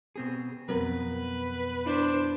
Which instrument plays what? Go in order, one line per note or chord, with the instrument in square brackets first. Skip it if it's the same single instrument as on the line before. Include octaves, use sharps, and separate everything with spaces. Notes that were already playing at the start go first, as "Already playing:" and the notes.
[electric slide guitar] B2 C4 G#4
[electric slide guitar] F2 B2 [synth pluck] F#3 C4 A#4 [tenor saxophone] B4
[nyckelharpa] D4 C5 [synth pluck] E4